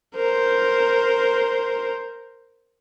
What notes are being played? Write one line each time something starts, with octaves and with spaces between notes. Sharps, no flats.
A#4 C5